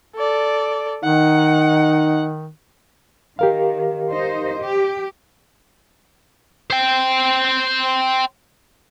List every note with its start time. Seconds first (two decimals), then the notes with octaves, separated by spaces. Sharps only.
0.16 A4 D5
1.04 D#3 D#4 F#5
3.39 D#3 G4 A#4 F5
4.11 D#4 C5 D#5
4.60 G4
6.70 C5 G5